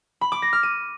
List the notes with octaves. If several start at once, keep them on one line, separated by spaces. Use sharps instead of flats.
B5
D6
A#6
F6
D#7